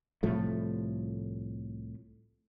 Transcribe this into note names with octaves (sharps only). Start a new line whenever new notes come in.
C2 A2 F3 A3